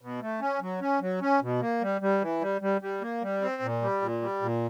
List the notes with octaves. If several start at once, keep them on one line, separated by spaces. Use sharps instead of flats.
B2
A3
C#4
F#3
C#4
F#3
C#4
B2
A#3
G3
G3
E3
G3
G3
G3
A#3
G3
C4
A#2
G3
A#2
G3
A#2